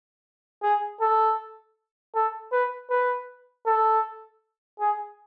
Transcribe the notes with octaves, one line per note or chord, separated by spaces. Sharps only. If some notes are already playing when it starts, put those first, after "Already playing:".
G#4
A4
A4
B4
B4
A4
G#4